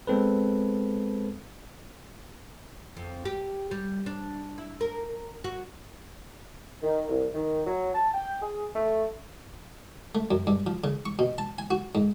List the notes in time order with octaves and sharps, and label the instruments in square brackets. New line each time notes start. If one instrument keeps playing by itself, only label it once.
[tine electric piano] G#3 B3 C4 A4 B4
[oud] F2
G4
G3
D4
E4
A#4
F#4
[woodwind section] D#3
C2
D#3
F#3
A5
G5
G#4
A3
[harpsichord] A3
F#2
G2
F3
C#3
C#6
B2
A5
G#5
F#4
G#2